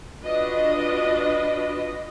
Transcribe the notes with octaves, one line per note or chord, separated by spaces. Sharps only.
D4 F4 F#4 B4 D#5